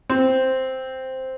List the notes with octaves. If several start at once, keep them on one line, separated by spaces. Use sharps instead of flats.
C4